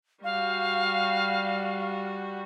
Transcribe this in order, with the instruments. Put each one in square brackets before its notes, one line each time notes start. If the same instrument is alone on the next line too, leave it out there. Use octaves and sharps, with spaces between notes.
[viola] G3 F#4 [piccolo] F5